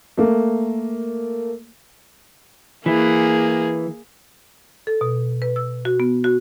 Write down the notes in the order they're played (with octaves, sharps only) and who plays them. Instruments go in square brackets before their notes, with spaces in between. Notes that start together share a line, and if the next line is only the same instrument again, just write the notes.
[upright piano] A3 A#3
[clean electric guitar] E3 [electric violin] A#3 G#4
[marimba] A4
B2
B4
E6
F#4
B3
F#4